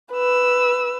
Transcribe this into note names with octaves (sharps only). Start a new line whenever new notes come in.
B4 E6